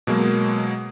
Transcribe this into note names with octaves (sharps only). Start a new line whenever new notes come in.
B2 F#3 G#3 A#3